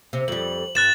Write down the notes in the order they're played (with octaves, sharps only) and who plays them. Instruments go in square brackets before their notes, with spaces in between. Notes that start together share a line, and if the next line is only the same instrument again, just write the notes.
[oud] C3
[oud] F2 G3 [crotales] F#7
[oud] G2 [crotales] F#6 A6 E7